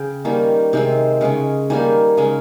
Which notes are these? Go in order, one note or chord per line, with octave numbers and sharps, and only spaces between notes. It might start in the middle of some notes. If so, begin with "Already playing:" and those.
Already playing: C#3 G5
D#3 G3 A#3 C#4
C3 D#3 G#3 C4
C#3 G#3 C#4
D#3 G3 A#3 G#5
C#3 G#3 C#4